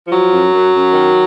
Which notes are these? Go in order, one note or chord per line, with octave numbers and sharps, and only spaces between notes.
F3 F#3
F#2
F#2
F#2
D#3